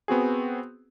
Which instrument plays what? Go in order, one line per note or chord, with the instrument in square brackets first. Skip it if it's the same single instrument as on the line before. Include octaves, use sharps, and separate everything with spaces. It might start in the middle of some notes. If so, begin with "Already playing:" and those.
[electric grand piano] B3 C4 F#4 G#4